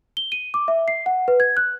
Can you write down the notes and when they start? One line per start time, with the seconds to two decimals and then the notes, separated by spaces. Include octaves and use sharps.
0.17 G7
0.32 D#7
0.54 D6
0.68 E5
0.88 C7
1.06 F#5
1.28 B4
1.40 G#6
1.57 F#6